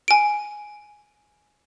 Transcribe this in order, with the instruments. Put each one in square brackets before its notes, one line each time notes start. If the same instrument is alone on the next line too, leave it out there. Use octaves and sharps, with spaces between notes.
[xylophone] G#5 D7